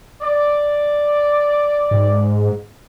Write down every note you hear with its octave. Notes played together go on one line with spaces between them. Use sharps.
D5
G#2